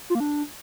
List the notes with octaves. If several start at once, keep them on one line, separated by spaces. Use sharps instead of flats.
F4
A#3
D4